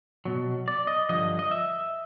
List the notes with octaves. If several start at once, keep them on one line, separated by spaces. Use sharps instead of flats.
B2 F#3
D5
D#5
G2 D3 F3 D#5
D#5
E5